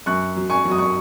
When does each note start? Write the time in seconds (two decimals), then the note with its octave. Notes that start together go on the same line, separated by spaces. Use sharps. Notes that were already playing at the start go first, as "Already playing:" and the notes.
0.06 F#2 C#6 F#6
0.36 F#3
0.50 G#5 C#6
0.65 F#3
0.71 D#6
0.79 C#6